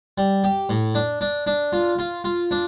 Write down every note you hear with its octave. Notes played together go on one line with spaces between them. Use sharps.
G3
G4
A2
D4
D4
D4
F4
F4
F4
D4